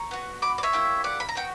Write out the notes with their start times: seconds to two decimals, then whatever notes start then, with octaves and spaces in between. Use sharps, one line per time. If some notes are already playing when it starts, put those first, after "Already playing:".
Already playing: A#5 C#6
0.11 B3 F#4
0.42 B5 D6
0.58 D5
0.63 C#5 E5
0.73 A#3 E4 G4
1.04 D5 F#5
1.20 B5
1.29 A#5
1.35 B3 F#4 G5